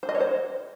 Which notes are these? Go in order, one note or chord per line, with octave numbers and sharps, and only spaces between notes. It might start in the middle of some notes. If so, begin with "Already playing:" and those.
C5
D#5
C#5
C5